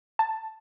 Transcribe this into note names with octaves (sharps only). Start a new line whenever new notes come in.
A5